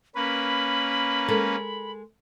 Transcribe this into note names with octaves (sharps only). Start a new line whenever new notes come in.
A#3 C#4 B4 B5
G#3 A4 A#4